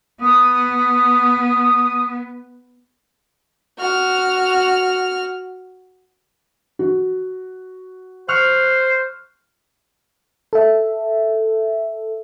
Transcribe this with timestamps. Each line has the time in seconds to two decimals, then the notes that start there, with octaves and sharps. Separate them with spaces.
0.20 B3 D#6
3.78 F#4 F6
6.79 F#4
8.29 C5 C#6 F6 F#6
10.53 A4 E5